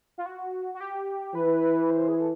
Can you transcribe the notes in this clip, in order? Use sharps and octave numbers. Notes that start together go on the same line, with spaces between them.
F4
F#4
F#4
G4
E3 B4
C5
G#4
A4